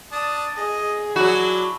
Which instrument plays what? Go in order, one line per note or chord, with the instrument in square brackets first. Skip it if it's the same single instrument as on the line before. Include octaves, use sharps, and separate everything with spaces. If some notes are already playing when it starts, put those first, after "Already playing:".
[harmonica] D4 A5 D#6
[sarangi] G#4 [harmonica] D#5
[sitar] F#3 F#4 [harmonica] D4 E4